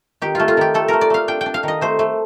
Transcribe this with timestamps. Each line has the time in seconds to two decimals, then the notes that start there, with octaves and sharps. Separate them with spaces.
0.22 D#3 G4
0.35 A3 F4
0.48 F4
0.57 D#3 G4
0.74 A3 A4
0.88 A3 A#4
1.01 D5
1.10 A3 F5
1.28 D4 G5
1.41 G5
1.46 D4
1.54 F5
1.63 D#3 D#5
1.81 A3 C5
1.99 A3